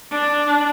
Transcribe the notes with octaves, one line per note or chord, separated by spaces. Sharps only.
D4